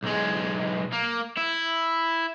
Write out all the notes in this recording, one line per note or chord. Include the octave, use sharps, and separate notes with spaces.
B1 G#3
A#3
E4